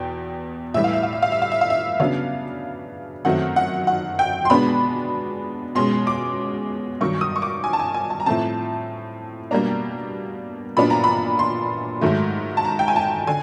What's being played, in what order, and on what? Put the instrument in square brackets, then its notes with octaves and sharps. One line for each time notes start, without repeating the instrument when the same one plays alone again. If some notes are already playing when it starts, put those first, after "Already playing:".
Already playing: [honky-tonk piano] E2 B2 G5
A2 E3 G3 E5
F5
E5
F5
E5
F5
E5
F5
E5
F5
E5
C#3 F#3 B3 D4 F5
F#2 D#3 F#3 A3 C4 F#5
F#5
F#5
G5
C6
B2 G#3 B3 D4 B5
B2 G#3 C#4 C6
D6
G2 D#3 F#3 C#6
D#6
C#6
D6
G#5
A5
G#5
G#5
A5
A#5
A2 F3 A3 C4 A5
B2 G3 A#3 D4 A#5
A#2 F#3 B3 D4 B5
A#5
B5
C6
G#2 D#3 F#3 A3
A5
A#5
G5
G#5
A5
D3 G#5